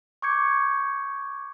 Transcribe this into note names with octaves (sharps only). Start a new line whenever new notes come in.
C#6 D6 G6 G#6 C#7